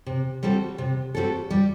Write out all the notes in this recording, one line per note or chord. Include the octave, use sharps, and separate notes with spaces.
C3
G3 C4 F#4 A4
C3
G3 C4 F#4 A4
G3